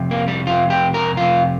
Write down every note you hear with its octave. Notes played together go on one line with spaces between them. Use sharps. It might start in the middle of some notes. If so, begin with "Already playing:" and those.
Already playing: F2 C3
A#3
G3
F2 C3 F4
G4
A#4
F2 C3 F4